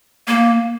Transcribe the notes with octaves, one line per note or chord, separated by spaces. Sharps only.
A#3